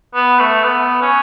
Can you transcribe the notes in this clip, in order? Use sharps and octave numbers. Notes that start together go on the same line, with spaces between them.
B3
A3
B3
C#4